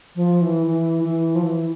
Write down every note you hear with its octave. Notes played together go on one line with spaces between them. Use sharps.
F3
E3
E3
E3
F3
E3